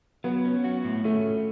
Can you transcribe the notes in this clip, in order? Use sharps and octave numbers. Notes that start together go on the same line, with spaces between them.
F#3 B3
C#4
F#4
A2
A3 C#4